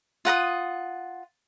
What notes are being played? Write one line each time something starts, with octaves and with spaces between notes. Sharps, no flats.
F4 F#5 A#5 D#6